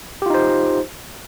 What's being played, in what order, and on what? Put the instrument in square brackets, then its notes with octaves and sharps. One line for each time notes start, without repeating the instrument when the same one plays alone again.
[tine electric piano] G4
F4
D#4
C5